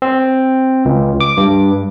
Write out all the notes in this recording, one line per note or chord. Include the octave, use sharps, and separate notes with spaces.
C4
C#2
D6
G2